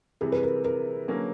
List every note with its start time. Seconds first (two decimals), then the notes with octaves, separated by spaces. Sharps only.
0.21 C3 E3 G3 G#4
0.32 B4
0.43 A#4
0.64 A#4
1.08 D3 F#3 A#3 C#4